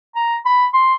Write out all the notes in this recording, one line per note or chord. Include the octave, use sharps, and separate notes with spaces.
A#5
B5
C6